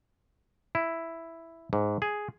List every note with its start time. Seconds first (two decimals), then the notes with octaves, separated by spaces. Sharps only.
0.75 E4
1.73 G#2
2.02 G#4